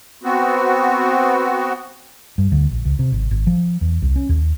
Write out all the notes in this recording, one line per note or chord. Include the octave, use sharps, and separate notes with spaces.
B3 C4 F#4
G2
D2
A#1
C#2
C3
G#1
G#1
F3
E2
C2
C#4
D#2